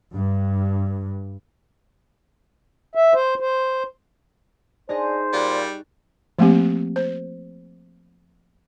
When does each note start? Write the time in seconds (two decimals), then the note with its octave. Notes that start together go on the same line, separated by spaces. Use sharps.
0.13 G2
2.95 E5
3.14 C5
3.40 C5
4.89 D4 D#4 G#4 C5 D#5
5.33 A#2 G3 C#6 F#6 A6
6.39 F3 A3 A#3 C4 G4
6.96 C5